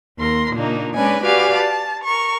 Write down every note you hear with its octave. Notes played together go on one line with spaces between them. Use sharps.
D#2 A#4 C6
A#2 C#3 A#3 D4 D#4
G#3 C#4 D4 B4 D5 G#5
F#4 G4 B4 D5 F5 G#5
A5
A#4 C#6